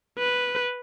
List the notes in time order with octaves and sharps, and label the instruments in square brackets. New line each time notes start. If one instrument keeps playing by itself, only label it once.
[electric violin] B4